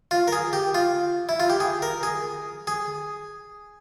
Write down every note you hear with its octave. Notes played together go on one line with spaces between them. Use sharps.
F4
A#4
G#4
G4
F4
E4
F4
G4
G#4
A#4
G#4
G#4